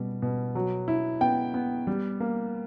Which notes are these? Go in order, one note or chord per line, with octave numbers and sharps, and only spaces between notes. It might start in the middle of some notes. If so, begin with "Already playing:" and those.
Already playing: B2 G3
B2
F#3
E4
B3 G5
B3
G3
A#3